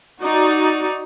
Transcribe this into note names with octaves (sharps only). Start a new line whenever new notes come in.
D#4 F#4 D5